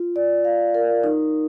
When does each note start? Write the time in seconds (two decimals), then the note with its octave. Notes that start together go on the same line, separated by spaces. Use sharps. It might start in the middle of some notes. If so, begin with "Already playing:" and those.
Already playing: F4
0.16 D5
0.45 F5
0.75 A#4
1.04 D#4